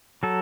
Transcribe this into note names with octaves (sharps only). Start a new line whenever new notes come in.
F#3 A4